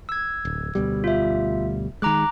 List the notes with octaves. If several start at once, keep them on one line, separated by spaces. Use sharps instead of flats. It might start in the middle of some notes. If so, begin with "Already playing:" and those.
E6 G#6
D1
D2 B2 G3
F4 E5
D#3 G#3 A#5 D6 F#6